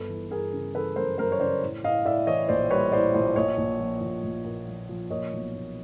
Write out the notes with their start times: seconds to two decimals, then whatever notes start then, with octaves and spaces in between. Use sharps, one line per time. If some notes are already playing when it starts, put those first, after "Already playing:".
Already playing: G1 A4 B4
0.09 E3
0.31 G1 G#4 A#4
0.53 C#3
0.75 E3 A4 B4
0.96 F#2 A#4 C5
1.18 F#2 A#4 C5
1.32 C#5
1.40 C#3 C5 D5
1.61 A2
1.84 A2 D#5 F5
2.05 A2 D5 E5
2.27 E3 C#5 D#5
2.49 A#1 C5 D5
2.70 G3 B4 C#5
2.92 A2 C5 D5
3.14 A#1 C5 D5
3.36 A#1 C#5 D#5
3.58 A#1
3.80 F3
4.01 A#1
4.24 A#1
4.45 A#2
4.68 F3
4.89 F3
5.10 A#2 C#5 D#5
5.33 B1
5.54 A#2